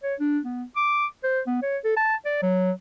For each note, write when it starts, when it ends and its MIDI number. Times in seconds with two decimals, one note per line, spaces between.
0.03 0.15 73
0.20 0.39 62
0.45 0.64 59
0.76 1.06 86
1.24 1.41 72
1.47 1.59 59
1.63 1.78 73
1.85 1.95 69
1.97 2.15 81
2.25 2.40 74
2.43 2.72 54